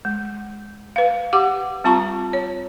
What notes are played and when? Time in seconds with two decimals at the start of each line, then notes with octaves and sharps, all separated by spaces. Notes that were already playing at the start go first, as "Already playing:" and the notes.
0.05 G#3
0.96 B4 F5
1.33 G4 F#5 D6
1.84 G3 C4 F4 A5 A#5 C#6
2.33 C#5